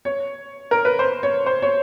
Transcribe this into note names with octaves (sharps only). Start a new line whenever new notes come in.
C#5
A#4
B4
C5
C#5
C5
C#5